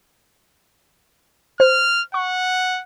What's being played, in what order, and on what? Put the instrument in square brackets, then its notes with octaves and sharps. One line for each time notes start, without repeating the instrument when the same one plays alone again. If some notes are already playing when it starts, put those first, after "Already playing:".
[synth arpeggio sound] C5 [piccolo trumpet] F6
[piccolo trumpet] F#5 [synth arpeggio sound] C#6